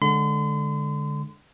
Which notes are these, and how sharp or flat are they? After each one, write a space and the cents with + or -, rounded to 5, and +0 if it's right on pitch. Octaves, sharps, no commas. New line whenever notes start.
D3 +0 G#3 +0 C6 -40